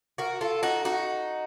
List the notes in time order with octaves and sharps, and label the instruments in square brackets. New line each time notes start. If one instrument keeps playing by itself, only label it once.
[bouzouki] F#4 A#4
F4 A4
D#4 F#4
D#4 F#4